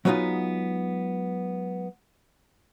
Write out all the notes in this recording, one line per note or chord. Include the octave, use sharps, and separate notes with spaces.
F#3 G#3 B3 C4 D#4 F4